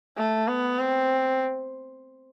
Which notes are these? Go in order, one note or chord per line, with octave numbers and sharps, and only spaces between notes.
A3
B3
C4